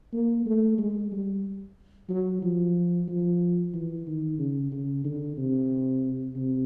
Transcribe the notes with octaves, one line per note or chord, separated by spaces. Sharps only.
A#3
A3
G#3
G3
F#3
F3
F3
E3
D#3
C#3
C#3
D3
C3
C3